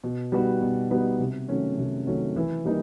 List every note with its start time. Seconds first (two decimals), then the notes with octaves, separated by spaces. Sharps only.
0.04 B2
0.32 G3 B3 D#4 F#4
0.61 B2
0.90 G3 B3 D#4 F#4
1.19 C3
1.48 D#3 F#3 A3 C#4
1.77 C3
2.07 D#3 F#3 A3 C#4
2.36 E3
2.65 G3 A#3 D#4